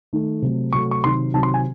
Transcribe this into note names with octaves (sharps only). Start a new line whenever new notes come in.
D#3 A3
C3 F#3 A3
C3 F#3 A3 C#6
C#6
C3 D#3 F#3 C6
C3 D#3 F#3 A5
C6
G#5